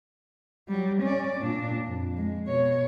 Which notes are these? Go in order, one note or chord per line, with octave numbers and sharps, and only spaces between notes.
F#3 G3
C#4 D5
A#2 D4
F2
G#3
B2 C#5